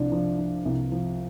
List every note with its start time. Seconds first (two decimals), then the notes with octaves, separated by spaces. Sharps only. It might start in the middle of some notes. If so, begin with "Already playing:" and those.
Already playing: C2 F3 D4
0.12 F3
0.39 F3
0.65 C2
0.92 F3